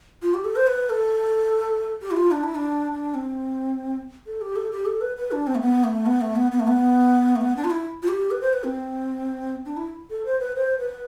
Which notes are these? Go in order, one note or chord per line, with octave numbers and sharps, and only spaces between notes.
F4
G4
A4
C5
B4
A4
G4
E4
F4
D4
E4
D4
D4
C4
A4
G4
A4
G4
A4
B4
B4
D4
C4
A3
B3
A3
B3
A3
B3
B3
A3
B3
A3
B3
D4
F4
E4
F4
G4
B4
C5
B4
C4
D4
E4
A4
C5
B4
C5
B4